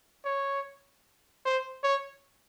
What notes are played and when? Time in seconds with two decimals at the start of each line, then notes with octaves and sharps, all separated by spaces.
0.25 C#5
1.45 C5
1.84 C#5